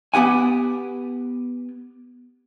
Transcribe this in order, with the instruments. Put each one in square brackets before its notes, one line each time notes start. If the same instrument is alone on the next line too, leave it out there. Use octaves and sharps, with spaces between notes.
[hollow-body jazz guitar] B3 G4 F#5 G#5